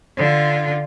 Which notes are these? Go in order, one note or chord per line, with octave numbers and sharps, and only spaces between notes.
D3 F4